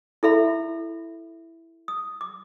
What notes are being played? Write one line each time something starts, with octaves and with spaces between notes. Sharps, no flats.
E4 A4 E5 B5
D#6
D6